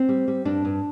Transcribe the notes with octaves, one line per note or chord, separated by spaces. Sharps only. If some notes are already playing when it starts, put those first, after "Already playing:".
Already playing: C4
G3
G3
G2 D4
G2